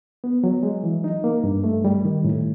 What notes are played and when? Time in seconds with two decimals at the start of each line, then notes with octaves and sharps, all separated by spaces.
0.24 B3
0.44 F#3
0.63 G#3
0.84 E3
1.04 D#4
1.24 A#3
1.44 G2
1.64 A3
1.85 G3
2.05 D#3
2.24 A2